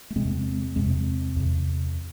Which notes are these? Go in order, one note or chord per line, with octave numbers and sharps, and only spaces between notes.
A3
E2 C3 G#3 C4
E2 C3 G#3 C4
E2 C3